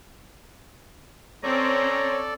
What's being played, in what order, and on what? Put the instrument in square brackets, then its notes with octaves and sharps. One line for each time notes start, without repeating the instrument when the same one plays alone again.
[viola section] C4 C#4 [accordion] A4 D5 [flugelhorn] C#5 [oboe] A#5